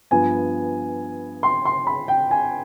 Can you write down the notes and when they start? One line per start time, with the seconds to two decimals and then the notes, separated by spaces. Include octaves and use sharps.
0.11 G2 F3 B3 G#5
1.43 C6
1.65 C6
1.87 B5
2.08 G5
2.31 G#5